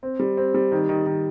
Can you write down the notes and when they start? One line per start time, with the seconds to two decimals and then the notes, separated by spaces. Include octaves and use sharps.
0.03 C4
0.19 G3
0.37 C4
0.54 G3
0.72 D#3
0.89 D#3
1.06 D#3